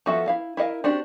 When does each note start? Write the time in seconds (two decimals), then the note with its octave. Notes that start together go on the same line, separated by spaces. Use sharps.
0.06 F3 B3 F#4 A4 E5
0.28 E4 F5
0.57 E4 A#4 D#5 F5
0.84 C4 D4 F#4 G4